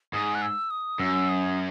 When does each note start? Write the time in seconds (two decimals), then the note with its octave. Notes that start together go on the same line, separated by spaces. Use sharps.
0.13 G#2 D#6
0.35 F#6
0.42 E6
0.71 D#6
0.99 F#2 E6
1.29 D#6